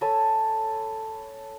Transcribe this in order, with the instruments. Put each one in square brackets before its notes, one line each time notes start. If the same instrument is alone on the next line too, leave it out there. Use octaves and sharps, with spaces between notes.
[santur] A4 C#5 G#5 B5